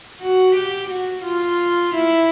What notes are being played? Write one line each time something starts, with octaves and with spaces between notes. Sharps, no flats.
F#4
G4
F#4
F4
E4